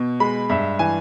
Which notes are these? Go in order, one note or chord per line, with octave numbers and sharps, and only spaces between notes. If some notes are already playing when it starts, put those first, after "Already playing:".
Already playing: B2
G#3 B5
G2 E5
E3 G#5